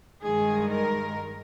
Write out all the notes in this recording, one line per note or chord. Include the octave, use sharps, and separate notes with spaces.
G2 D#3 G#3 G#4
A#4